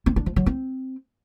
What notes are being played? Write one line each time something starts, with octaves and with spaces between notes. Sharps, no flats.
C4
D4
F3
F#3
C4